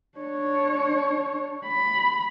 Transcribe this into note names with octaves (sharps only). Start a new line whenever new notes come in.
D4 C#5
B5